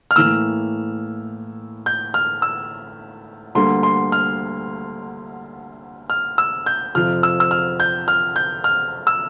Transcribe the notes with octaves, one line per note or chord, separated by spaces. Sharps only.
F6
A2 E3 A#3 E6
G6
F6
E6
D2 D3 G3 A#3 C6
C6
F6
F6
E6
G6
F2 C3 F3 F6
E6
E6
F6
G6
F6
G6
F6
E6